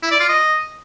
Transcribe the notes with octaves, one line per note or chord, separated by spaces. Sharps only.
E4
D5
F4
D#5